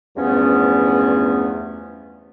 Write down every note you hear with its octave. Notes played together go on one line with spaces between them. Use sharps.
E2 G2 F3 A3 B3 C#4